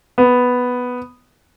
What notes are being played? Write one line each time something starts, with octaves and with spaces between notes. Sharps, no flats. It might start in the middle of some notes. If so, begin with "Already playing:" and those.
B3